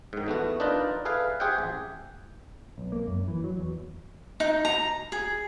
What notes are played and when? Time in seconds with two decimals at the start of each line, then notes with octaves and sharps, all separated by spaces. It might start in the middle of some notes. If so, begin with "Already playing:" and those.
0.13 G#2 D#3
0.26 E2 A3 B3 F#4
0.60 D4 D#4 F4 A#4 B4 D5
1.05 G#4 A4 B4 E5 F5
1.40 G4 G#4 C5 E5 F#5 G5
1.58 A1
2.78 B1
2.92 A#3
3.08 F#2
3.28 E3
3.44 F#3
3.58 E2
4.40 D#4
4.65 A#5
5.12 G#4